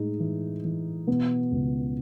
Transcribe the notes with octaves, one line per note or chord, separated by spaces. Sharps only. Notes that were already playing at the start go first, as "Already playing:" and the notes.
Already playing: A2 G#3 D#4
E3
E3
B2 B3
C#2